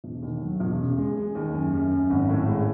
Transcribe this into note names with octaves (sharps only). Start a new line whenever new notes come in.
E1
D#2
F#3
E1
C#3
G#3
G#3
D#2
F#2
F#2
F#2
G#1
A2
G#3